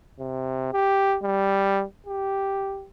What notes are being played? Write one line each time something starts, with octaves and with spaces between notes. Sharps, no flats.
C3
G4
G3
G4